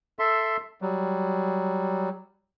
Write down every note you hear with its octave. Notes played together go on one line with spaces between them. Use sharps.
A4 E5 C6
F#3 G3